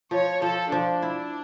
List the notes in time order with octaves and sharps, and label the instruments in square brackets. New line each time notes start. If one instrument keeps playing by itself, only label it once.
[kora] F3 [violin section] C#5
[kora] F3 [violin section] A4
[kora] F3 [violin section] D4
[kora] E4